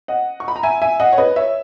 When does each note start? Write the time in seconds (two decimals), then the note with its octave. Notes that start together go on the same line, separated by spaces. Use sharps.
0.08 D#5 F#5
0.40 C#6
0.48 B5
0.56 A#5
0.63 E5 G#5
0.82 E5 G#5
1.00 D#5 F#5
1.13 C#5
1.18 B4 D#5
1.36 C#5 E5